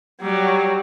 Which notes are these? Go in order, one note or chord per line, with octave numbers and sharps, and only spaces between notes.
F#3 G3